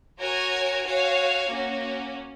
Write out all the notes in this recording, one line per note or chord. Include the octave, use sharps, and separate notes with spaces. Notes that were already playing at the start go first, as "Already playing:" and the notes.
F#4 A#4 C#5 G#5
F#4 C#5 F5 G#5
A#3 C#4 F#4